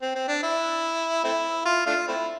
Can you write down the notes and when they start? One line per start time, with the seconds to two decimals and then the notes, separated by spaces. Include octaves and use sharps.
0.02 C4
0.15 C4
0.28 D4
0.43 E4
1.24 A3 C4 E4
1.65 F4
1.87 A3 D4 F4
2.08 A3 C4 E4